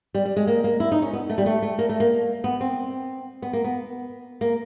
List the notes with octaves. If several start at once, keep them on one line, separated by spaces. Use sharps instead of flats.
G3
G3
G#3
A#3
A#3
E4
D#4
C#4
B3
A3
G3
A3
A3
A#3
A3
A#3
B3
C4
B3
A#3
B3
A#3